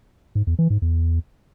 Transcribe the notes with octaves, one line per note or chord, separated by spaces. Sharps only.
G#2
E2
E3
G#2
E2